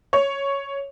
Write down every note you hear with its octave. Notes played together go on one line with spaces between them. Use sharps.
C#5